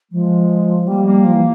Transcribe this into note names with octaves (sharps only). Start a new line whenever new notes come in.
F3 G#3
G3 A#3
A#3
F3
E3